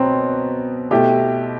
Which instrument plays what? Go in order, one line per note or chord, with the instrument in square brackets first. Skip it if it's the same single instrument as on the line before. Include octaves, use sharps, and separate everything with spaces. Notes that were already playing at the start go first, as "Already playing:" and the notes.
Already playing: [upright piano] B2 F#3 B3 [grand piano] C4
[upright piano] B2 A3 E4 G4